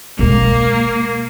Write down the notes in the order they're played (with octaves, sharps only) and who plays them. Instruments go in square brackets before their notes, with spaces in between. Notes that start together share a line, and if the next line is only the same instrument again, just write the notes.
[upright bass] B2 G#3 [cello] A#3